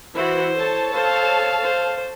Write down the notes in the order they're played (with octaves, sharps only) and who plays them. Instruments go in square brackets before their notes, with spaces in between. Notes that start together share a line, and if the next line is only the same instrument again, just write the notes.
[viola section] E3 E4 F#4 [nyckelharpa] C5
[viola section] A4 C#5 A5
[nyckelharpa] C5 [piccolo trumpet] F5
[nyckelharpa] C5